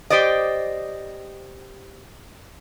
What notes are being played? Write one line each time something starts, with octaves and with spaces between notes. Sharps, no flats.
G4 C5 D5 D#5